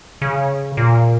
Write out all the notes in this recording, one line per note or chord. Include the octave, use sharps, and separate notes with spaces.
C#3
A#2